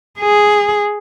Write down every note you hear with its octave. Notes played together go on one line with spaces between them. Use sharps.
G#4